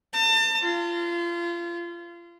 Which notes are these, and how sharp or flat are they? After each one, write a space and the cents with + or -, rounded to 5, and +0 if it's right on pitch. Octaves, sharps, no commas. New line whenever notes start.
A5 +35
F4 -30